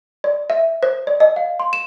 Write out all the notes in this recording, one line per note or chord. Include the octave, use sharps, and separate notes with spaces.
D5
E5
C5
D5
D#5
F5
C6
E7